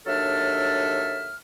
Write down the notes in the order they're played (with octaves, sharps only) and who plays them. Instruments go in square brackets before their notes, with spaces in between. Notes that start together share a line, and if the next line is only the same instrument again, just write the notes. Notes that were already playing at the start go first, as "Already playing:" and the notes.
[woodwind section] D#2 F#3 D4 A4 E5 F6